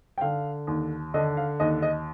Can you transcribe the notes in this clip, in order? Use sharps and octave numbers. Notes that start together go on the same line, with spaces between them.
G5
D3 F5
D#2
D3 D#5
F5
D#2 D#5
D#5